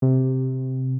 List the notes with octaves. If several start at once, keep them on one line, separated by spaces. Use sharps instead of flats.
C3